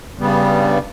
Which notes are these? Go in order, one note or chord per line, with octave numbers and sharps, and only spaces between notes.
G2 C#3 G3 B3